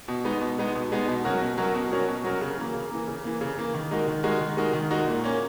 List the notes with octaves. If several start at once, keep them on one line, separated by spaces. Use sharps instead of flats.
B2
G#3 B3 D#4
B2
G#3 B3 D#4
B2
G#3 B3 D#4
B2
F#3 C#4 F#4 A#4
B2
F#3 C#4 F#4 A#4
B2
F#3 C#4 F#4 A#4
B2
F#3 C#4 F#4 A#4
C#3
E3 A#3
C#3
E3 A#3
C#3
E3 A#3
C#3
E3 A#3
D#3
G#3 D#4 F#4 A#4
D#3
G#3 D#4 F#4 A#4
D#3
G#3 D#4 F#4 A#4
D#3
G#3 D#4 F#4 A#4
A#2
A#3 C#4